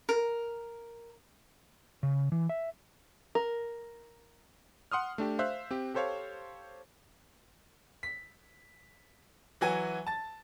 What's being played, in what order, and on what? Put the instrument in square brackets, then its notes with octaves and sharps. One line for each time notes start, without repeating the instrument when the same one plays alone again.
[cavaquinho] A#4
[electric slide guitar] C#3
E3
E5
[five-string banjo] A#4
[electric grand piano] F#5 C6 D#6 F6
A3 D4 G4
C5 E5 F5 E6 F#6
C4 G4
G4 A4 C5 C#5 F5
[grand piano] B6
E3 F#3 F#4 G#5
A5 A6